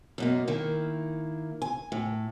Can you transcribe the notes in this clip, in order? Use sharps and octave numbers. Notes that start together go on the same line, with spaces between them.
F#2 B2 A#3
D#3 A#3 E4
G#5
A2